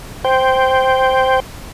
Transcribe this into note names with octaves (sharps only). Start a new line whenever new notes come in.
C5 G5